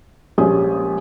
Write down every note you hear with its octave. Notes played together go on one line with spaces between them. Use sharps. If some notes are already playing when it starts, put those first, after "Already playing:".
A#1 G#3 C#4 G4 G#5 D#6